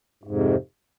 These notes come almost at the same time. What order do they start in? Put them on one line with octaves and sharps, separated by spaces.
G#2 F2 C3